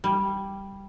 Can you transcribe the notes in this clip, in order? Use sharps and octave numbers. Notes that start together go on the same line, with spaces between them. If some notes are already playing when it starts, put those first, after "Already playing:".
G3